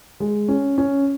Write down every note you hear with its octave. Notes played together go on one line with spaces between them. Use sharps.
G#3
C#4
C#4